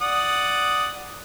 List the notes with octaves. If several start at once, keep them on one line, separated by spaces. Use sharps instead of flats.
D5 F#5 D#6